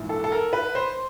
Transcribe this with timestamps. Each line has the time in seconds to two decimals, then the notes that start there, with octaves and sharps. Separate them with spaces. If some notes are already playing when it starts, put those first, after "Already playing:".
Already playing: A#1 G#2 E3
0.09 A4
0.24 A4
0.32 A#4
0.53 B4
0.75 C5